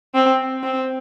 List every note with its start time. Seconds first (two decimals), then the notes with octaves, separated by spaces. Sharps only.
0.15 C4
0.63 C4